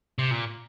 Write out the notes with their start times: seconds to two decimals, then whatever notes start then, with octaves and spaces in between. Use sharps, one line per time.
0.18 C3
0.31 A#2